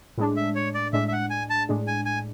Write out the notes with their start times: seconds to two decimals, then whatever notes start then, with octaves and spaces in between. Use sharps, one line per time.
0.17 A2 G#3 D4
0.36 E5
0.55 C#5
0.74 D5
0.93 A2 G#3 D4 E5
1.08 E5
1.12 F#5
1.30 G#5
1.50 A5
1.69 A2 G#3 D4
1.87 G#5
2.06 G#5